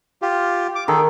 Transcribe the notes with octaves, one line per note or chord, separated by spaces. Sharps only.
F4 G4
D6
D#3 G#4 A4